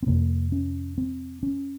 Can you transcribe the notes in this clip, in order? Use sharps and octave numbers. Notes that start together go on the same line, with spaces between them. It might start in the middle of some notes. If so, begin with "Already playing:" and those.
C4
F2 C3 A#3
C#4
C4
C#4